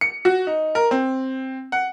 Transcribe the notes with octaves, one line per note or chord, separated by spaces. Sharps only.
C#7
F#4
D#4
A#4
C4
F#5